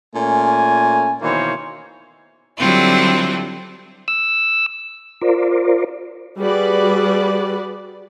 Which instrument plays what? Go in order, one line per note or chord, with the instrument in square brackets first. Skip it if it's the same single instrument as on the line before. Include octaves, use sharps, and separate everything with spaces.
[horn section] A#2 A3 C#4 G#5
B2 D#3 E3 A#3 C5 C#5
[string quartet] D3 F#3 G3 C4 E4 F4
[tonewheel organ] E6
F4 A#4 C5 D5
[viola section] G3 F#4 G#4 B4 D5